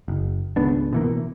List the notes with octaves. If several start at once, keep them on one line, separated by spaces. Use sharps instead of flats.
F#1
G#1 C#2 B3 D4
B2 E3 A#3